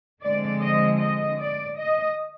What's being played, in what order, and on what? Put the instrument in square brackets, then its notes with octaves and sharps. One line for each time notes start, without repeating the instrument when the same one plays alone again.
[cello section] D3 F3 G#3 C4 D5
D#5
D#5
D5
D#5